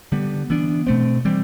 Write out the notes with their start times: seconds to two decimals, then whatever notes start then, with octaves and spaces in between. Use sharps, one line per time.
0.12 D3 G3 B3
0.50 E3 B3 D4
0.87 B2 A3 C4
1.25 E3 G3 C4